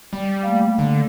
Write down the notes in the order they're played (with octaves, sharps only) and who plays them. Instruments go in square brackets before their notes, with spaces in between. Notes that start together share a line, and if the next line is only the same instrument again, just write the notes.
[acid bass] G3
[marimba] A3 A#3 F5
[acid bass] D3